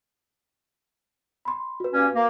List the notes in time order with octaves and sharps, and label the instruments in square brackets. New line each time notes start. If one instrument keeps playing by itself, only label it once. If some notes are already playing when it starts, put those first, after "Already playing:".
[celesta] B5 C6
F#4 B4
[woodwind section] G2 A#3 C#4
A#3